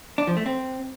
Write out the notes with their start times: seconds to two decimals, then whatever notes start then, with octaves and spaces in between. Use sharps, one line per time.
0.18 D4
0.27 F3
0.37 A3
0.46 C4